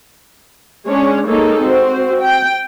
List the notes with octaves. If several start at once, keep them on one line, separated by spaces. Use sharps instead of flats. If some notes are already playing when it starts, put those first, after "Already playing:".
G#3 C#4 D4 C#5
G#3 A#3 D#4 G#4 A4 C#5
C4 F#4 C5
G5